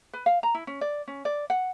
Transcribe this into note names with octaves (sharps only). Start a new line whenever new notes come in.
B4
F5
A#5
E4
C#4
D5
C#4
D5
F#5